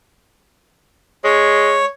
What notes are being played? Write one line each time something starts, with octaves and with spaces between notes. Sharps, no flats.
G#3 C#5